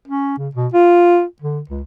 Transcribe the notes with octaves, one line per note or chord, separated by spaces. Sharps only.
C#4
C#3
B2
F4
D3
C#2